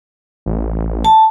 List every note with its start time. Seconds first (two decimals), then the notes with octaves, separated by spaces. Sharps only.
0.46 A1
1.05 A5